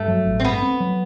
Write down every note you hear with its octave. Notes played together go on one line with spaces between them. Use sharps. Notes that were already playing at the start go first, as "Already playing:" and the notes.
Already playing: G2 A3
F#3
A1
C4
G2 B3
C4
F#3